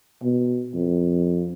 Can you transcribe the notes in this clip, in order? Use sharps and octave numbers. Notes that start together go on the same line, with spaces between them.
B2
F2